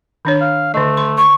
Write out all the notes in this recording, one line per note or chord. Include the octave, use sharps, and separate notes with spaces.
D#3 D4 C#5
F5
D3 A3 D#5
C6
C#6